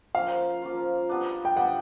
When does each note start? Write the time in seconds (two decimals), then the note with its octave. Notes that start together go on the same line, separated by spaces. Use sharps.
0.15 F3 A#3 C#4 F4 F5
0.62 F3 A#3 C#4 F4
1.09 G3 B3 D4
1.45 G5
1.57 G3 B3 D4 F#5